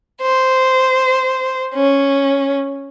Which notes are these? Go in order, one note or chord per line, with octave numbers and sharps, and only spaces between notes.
C5
C#4